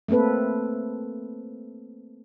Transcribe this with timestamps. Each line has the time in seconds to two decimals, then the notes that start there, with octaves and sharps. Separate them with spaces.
0.08 A3 A#3 C4 A4 B4